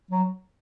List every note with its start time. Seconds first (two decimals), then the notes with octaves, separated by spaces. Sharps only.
0.11 F#3